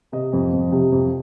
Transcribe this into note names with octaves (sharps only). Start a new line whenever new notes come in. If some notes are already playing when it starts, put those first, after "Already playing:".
C3 D#5
F2
F2
C3
F2